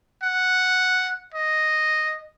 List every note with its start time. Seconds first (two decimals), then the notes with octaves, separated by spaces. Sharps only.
0.23 F#5
1.34 D#5